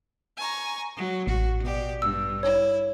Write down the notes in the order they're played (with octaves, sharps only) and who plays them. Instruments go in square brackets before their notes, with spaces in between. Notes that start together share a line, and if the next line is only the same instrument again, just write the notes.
[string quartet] G#5 A#5 C#6
F#3
[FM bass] A1 [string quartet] F#4
[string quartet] B2 G4 D5
[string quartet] G2 [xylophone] E6
[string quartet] E4 [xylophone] C#5